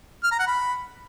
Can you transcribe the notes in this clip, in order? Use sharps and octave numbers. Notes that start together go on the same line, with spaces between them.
F6
A#5
F#5
B5